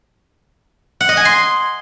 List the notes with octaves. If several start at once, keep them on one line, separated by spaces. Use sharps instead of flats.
F#5
D#5
G#5
C6